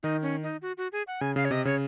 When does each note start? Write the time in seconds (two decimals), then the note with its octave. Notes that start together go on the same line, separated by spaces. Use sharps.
0.03 D#3 D#4
0.22 C#4
0.43 D#4
0.62 F#4
0.78 F#4
0.92 G#4
1.07 F#5
1.21 C#3 G#5
1.36 C#3 F5
1.45 C#5
1.51 C3 D#5
1.65 C#3 C#5